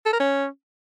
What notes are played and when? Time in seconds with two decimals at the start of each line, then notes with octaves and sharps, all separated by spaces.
0.06 A4
0.13 A#4
0.20 C#4